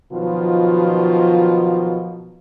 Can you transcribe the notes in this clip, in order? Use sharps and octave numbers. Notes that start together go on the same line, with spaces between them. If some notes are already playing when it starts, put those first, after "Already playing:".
B2 D#3 F3 F#3 F4